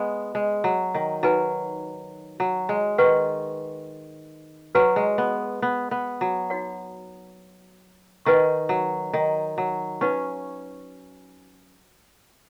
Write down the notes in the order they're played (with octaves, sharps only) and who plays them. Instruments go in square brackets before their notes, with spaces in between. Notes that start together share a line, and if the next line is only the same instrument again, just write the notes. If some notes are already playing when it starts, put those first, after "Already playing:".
Already playing: [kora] G#3 B3
G#3
F#3
D#3
[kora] F#3 [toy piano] D#4 B4 G#5 B5
[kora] F#3
G#3
[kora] D#3 [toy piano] B4 F#5 C#6
[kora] F#3 [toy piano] F#4 B4 G#5 C#6
[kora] G#3
B3
B3
B3
F#3
[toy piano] D#4 F#4 C#5 F#5
[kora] D#3 [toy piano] D#4 B4 D#5 F#5 C#6
[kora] F#3
D#3
F#3
[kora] C#4 [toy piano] D#4 B4 F#5 C#6